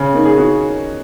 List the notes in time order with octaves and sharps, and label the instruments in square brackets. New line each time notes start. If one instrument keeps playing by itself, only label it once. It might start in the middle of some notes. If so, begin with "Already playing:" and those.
Already playing: [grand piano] C#3 [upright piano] C#4
[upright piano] A#3 D#4
[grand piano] G#4
[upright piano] C#4 F#4